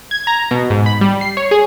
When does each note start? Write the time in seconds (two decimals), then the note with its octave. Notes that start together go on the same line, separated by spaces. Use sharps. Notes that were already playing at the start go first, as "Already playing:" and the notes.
0.11 G#6
0.27 A#5
0.51 B2
0.70 G#2
0.86 B5
1.01 G3
1.21 C7
1.37 C#5
1.51 G#4